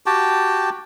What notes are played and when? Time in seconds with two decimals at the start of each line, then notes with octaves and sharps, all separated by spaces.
0.06 F#4 G4 G5 A5